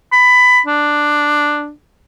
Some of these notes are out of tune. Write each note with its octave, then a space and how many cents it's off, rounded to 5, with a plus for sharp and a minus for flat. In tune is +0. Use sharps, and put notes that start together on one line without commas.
B5 +15
D4 +5